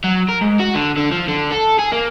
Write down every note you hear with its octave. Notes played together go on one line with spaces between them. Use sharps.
F#3
A#4
G#2
F#4
D3
D3
F3
D3
A4
G#4
A#3